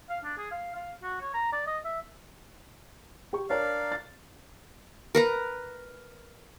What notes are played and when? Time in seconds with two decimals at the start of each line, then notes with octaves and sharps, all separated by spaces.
0.10 F5
0.24 D4
0.38 G#4
0.51 F5
0.75 F5
1.03 F#4
1.22 C#5
1.34 A#5
1.53 D5
1.67 D#5
1.85 E5
3.33 G4 C#6
3.50 D4 A#4 C#5 D5 F5 A#5
3.92 A6
5.15 A#4 B4 A#5